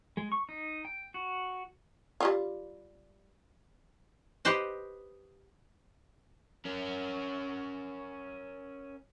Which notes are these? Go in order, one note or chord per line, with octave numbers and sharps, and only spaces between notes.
G#3
C#6
D#4
G5
F#4
G3 E4 F4
G4 B4 C5 D#5
C#4 A#4